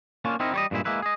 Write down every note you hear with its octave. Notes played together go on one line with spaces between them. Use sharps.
A#3 C#4 D4 F4
C4 D#4 E4 A#4
G3 C#5 D#5
G2 A#2 G#3 E4
G#3 A#3 E4 B4
G#4 D#5